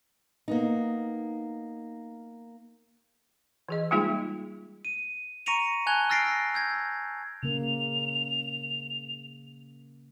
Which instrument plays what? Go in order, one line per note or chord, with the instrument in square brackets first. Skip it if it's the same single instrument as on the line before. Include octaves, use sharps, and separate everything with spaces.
[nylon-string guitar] A#3 B3 D#4
[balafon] E3 G#4 D#5
G3 G#3 A#3 D#4 F4 G#4
[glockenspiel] D#7
A#5 C#6 A#6 C#7 D#7 F7
G#5 A5 F#6 G#6 F7 G7
E6 F6 A6 A#6 C7 D7
E6 G6 G#6 A#6
[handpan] C#3 A#3 [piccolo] F7